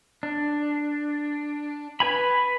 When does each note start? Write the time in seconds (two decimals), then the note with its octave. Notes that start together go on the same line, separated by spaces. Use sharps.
0.23 D4
2.00 B4 G#5 B5